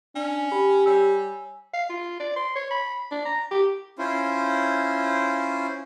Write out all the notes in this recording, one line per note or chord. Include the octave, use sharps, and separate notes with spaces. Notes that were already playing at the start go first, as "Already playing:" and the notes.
C#4 D4
G4 B5
G3 C#5 G#5 E6
F5
F4
D5
C6
C#5
B5
D4
A#5
G4
C#4 E4 F4 C5